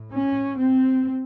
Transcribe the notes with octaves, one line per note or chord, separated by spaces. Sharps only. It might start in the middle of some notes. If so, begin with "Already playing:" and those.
Already playing: A2
C#4
C4